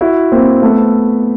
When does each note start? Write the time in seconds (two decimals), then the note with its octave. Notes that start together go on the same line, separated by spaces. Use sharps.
0.01 E4 F#4
0.32 A#3 C4
0.62 A3 B3